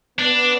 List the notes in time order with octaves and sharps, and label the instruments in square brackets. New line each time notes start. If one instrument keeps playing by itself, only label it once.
[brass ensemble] B3 [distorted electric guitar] D4